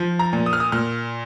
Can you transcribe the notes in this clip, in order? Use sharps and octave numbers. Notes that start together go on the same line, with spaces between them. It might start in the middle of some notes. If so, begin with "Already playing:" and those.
Already playing: F3
A#5
A#2
D#6
F6
D#6
A#2 F6